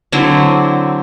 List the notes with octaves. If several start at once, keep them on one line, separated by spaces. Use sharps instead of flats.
D3 F#3 C4 E4